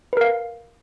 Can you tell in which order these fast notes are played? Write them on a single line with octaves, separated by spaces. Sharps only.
B4 A#4 F5